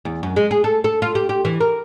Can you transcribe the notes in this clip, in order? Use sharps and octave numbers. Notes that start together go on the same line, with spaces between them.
E2
F#2
G#3
G#4
A4
A4
F4
G4
G4
E3
A#4